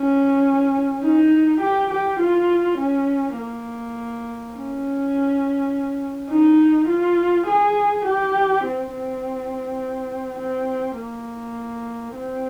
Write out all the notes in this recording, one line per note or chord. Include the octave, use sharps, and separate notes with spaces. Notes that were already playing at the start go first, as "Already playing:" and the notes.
Already playing: C#4
D#4
G4
G4
F4
C#4
A#3
C#4
D#4
F4
G#4
G4
C4
C4
C4
A#3
C4